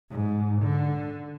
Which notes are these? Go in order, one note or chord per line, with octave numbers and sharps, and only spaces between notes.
G#2
D3